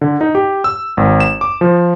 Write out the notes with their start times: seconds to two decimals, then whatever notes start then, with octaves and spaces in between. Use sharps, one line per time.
0.01 D3
0.21 D#4
0.35 G4
0.64 E6
0.97 G#1
1.20 E7
1.41 D6
1.61 F3